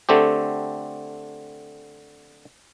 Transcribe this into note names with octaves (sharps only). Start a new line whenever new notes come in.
D3 A3 C4 G4